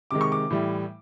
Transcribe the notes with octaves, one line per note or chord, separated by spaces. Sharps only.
C3 D#3 G#3 D6
C#6
D6
A2 E3 G3